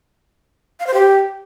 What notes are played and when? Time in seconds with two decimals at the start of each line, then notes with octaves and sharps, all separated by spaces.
0.80 F5
0.87 C5
0.94 G4